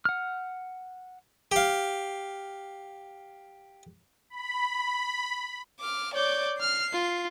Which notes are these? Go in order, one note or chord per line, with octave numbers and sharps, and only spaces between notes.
F#5 F6
G4 F5
B5
D6 F6
C#5 D5 D6 G6
F6 C7
F4